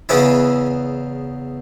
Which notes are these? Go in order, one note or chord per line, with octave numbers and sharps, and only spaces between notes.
E2 C#3 E3 C#4 E4